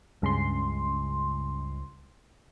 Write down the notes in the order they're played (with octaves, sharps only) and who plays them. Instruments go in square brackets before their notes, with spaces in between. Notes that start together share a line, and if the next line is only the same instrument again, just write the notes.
[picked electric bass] C#2 G#3 [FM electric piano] G2 C#3 C6